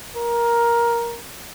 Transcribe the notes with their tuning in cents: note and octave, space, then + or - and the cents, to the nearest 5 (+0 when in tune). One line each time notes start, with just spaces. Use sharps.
A#4 +10